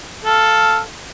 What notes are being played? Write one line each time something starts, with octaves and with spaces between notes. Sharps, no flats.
A4 F5